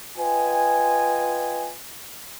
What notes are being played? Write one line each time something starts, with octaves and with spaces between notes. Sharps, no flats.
F4 B4 D#5 G5 G#5